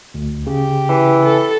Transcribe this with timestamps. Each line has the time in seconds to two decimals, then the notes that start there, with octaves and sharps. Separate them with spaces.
0.14 D2
0.47 C#3 G4
0.89 E3
1.24 A4